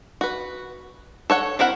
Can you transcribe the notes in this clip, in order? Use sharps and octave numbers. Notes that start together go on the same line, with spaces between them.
F#4 B4
A4 C#5 F#5
C4 E4 A#4 F#5